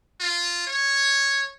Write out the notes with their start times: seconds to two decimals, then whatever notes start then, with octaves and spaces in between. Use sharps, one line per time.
0.20 F4
0.67 C#5